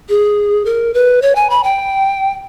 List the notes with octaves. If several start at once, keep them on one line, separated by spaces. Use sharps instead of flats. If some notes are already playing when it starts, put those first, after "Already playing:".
G#4
A#4
B4
C#5
G#5
B5
G5